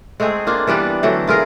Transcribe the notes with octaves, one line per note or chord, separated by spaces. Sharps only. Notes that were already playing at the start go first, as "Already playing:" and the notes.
G#3 A3 C4 G#4
A#3 D4 F4
E3 G3 B3 D4
D3 E3 F#3 A3
E4 F4 G#4 A#4